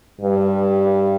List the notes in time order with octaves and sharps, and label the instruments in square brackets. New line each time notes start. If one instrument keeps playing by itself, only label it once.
[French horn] G2